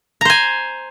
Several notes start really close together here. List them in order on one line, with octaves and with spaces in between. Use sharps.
A#5 C5 G#5